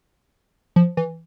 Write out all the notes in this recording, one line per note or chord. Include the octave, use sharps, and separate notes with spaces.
F3
E3